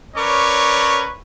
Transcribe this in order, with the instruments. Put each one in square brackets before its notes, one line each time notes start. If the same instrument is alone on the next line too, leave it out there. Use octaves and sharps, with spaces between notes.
[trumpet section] C#4 A#4 B4 C#5 D5 C#6